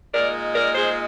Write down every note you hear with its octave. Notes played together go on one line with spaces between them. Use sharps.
A#2 G#3 D#4 A#4 D5
A#4 D5
G#4 C5